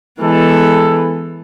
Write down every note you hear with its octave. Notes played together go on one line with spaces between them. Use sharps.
E3 G#3 B3 A4